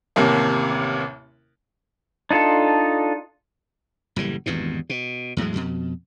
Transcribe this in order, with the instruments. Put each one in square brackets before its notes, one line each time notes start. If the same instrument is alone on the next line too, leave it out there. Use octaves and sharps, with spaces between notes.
[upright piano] A1 D#2 C3 A#3
[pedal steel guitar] D4 D#4 F4 A4
[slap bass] F#1 A2 E3 G3
G#1 E2 G2 B2
B2
E2 A2 F#3 G#3
F2 B2